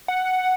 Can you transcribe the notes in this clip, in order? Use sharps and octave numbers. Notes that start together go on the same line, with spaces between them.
F#5